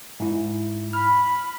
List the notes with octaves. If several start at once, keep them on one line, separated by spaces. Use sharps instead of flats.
G#2 E4
B5 F6